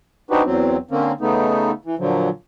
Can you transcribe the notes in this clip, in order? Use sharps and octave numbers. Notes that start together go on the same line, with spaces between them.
C4 D4 D#4 F#4 G4 B4
E2 F#3 C4
D3 A#3 C4 C#4
C#3 A3 B3 D#4
E3
A#2 D3 F3 F#3